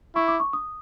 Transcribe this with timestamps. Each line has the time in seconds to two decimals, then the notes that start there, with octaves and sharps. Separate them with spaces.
0.15 E4 C#6
0.28 D6
0.40 C#6
0.53 D#6